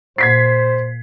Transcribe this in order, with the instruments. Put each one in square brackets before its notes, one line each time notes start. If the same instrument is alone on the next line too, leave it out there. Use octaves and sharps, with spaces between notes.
[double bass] A#2 [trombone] C5 [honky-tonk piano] G#6 B6 C7